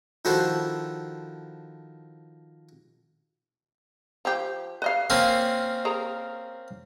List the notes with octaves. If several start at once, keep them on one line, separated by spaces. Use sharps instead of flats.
D#3 F3 E4 F#4 A4 C5
F3 G4
B4 D#5 F5
A#3 C4 C#4
G#4 A#4 A#5